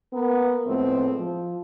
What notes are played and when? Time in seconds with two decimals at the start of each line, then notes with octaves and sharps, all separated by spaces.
0.13 A#3 B3 A#4
0.66 A2 F3 G#3 A3 B3 C4
1.18 F3